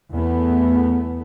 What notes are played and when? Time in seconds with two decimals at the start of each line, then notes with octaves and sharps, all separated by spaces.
0.14 E2 A3 B3